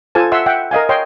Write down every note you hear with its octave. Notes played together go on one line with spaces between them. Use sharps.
F4 A4 C5 G#5 A5
E5 F#5 C6 E6
E5 F#5 G5
A#4 D#5 F5 G#5
C#5 D#5 G5 C6